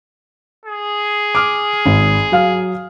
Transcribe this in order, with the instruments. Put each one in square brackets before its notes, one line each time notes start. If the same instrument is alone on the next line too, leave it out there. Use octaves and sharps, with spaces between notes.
[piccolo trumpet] G#4
[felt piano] D6 F6
G#1
F#3 F5 F6